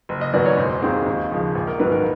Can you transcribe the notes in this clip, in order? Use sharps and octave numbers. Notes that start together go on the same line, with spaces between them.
F#1
D#5
F#2 D#3 F#3 B3 D5
C#5
E1 C5
D#2 D#3 G#3 C4
D#2
C#3 F3 G#3
A#1
A#4
G#2 D#3 F#3 B3 B4
A#4